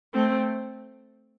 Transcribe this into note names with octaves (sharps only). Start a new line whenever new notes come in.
A3 C4